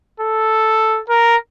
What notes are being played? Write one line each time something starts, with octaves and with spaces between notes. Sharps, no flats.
A4
A#4